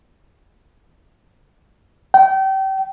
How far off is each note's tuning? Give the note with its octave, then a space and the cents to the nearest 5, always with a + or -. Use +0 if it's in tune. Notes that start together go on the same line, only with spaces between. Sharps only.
G5 -30